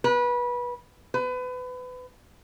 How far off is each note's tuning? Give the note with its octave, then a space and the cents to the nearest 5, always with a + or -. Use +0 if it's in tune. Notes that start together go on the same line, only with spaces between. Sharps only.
B4 -25
B4 +30